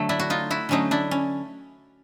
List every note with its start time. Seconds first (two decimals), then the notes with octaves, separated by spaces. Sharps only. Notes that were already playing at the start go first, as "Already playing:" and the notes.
Already playing: D3 F#3 A3
0.09 D4 E4
0.19 F#4
0.30 D#4 F4
0.51 E4 F#4
0.69 D3 F#3 A3 C#4 D#4
0.91 D4 E4
1.11 C#4